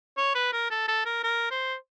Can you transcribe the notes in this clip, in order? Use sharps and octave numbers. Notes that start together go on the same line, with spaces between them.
C#5
B4
A#4
A4
A4
A#4
A#4
C5